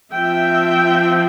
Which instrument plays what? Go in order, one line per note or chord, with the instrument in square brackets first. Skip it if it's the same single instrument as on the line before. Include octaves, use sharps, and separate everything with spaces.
[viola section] F3 C4 E5 G5